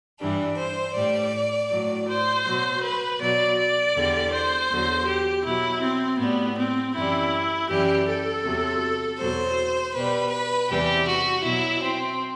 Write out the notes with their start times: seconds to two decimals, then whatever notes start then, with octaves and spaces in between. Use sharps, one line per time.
0.20 G2 E3 G3 D4
0.57 C5
0.95 A2 G3 D5
1.70 A2 F#3
2.07 C5
2.45 B2 F#3
2.82 B4
3.20 B2 F#3 D5
3.57 D5
3.95 E2 D3 G3
4.32 C5
4.70 E2 D3 F#3
5.07 G4
5.44 B2 F#3 E4
5.82 C4
6.19 A2 G3 B3
6.57 C4
6.94 F#2 E3 G3 E4
7.69 F#2 E3 G3 G4
8.07 A4
8.44 E2 C3 F#3
9.19 E2 B2 F#3 C5
9.94 B2 G3 B4
10.31 B4
10.69 E2 C3 E3 G3 G4
11.07 F#4
11.44 B2 F#3 E4
11.82 C4